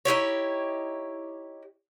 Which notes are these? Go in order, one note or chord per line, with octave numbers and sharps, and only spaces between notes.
D#4 E4 G4 C#5